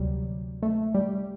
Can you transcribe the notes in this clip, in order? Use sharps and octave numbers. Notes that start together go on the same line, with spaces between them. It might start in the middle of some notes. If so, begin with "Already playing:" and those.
Already playing: D2 C3 F#3 G3
A3
G3